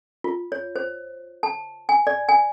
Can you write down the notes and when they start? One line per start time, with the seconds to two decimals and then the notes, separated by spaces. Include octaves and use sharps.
0.24 F4
0.52 C#5
0.76 C5
1.43 A5
1.89 G#5
2.07 D5
2.28 G#5